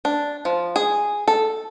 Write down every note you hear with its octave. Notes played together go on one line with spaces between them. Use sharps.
D4
F3
G#4
A4